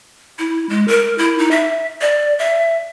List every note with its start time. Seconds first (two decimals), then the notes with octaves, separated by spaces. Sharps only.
0.39 E4
0.69 G#3
0.88 A#4
1.18 E4
1.38 D#4
1.51 E5
2.01 D5
2.39 E5